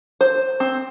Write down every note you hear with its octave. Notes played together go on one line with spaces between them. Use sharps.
C5
C4